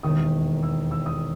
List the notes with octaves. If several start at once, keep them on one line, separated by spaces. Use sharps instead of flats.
E1 D#2 D#3 D#6
E6
E6
D#6